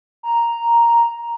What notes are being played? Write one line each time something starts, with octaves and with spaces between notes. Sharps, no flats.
A#5